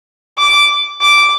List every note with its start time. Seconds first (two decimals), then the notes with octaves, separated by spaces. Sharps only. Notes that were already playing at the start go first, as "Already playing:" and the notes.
0.38 D6
1.01 D6